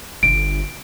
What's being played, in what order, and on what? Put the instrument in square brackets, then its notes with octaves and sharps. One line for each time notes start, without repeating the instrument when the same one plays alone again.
[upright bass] G1 D3 [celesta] D7